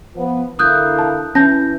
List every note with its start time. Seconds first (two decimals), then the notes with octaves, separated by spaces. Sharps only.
0.16 F3 B3
0.59 D3 A#3 E4 D#6 F#6 G6
0.99 A5
1.35 E3 C#4 A5 G6 A#6